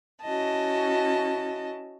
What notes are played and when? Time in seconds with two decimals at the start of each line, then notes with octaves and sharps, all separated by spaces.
0.23 C#4 E4 F#4 D#5 A5